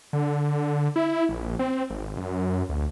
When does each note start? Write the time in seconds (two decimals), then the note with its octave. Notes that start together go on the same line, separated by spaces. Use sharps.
0.13 D3
0.96 E4
1.29 A#1
1.59 C4
1.90 G#1
2.17 F#2
2.69 D2